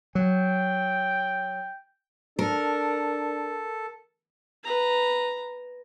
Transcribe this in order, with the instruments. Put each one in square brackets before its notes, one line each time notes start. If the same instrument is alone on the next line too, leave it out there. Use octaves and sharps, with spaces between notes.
[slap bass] F#3 [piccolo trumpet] G5
[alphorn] D4 [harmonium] A4 [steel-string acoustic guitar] A#4
[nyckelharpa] B4 A#5